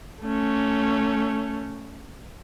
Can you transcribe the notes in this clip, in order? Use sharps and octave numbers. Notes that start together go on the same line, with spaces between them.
A3 C#4